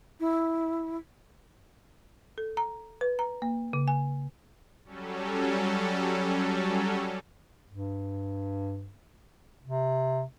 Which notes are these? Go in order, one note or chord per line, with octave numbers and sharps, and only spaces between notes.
E4
A4
A#5
B4
A#5
A#3
C#3
G#5
F#3 G3 C#4 A4
G2
C3